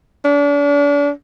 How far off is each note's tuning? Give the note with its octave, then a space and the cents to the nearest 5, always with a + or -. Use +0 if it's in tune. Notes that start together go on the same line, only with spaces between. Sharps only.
D4 -40